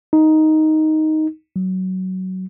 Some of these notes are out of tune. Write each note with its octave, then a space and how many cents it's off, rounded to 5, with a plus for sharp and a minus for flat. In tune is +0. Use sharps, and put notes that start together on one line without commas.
D#4 +5
F#3 +15